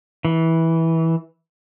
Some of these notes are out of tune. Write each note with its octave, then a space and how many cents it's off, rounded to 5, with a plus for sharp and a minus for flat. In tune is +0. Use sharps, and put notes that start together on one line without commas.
E3 -15